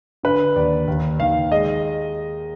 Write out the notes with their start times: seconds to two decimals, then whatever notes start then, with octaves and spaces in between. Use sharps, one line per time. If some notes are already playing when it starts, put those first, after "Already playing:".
0.23 D3 B4
0.56 D#2 D5
0.87 D#2
1.20 D#3 F5
1.52 G#3 D#5